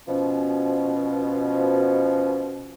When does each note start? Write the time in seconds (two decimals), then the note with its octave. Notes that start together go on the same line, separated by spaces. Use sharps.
0.08 B2 F3 C#4